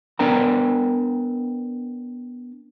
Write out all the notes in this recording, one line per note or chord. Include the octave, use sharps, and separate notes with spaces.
B3 D4 A#4 G5 A5 A#5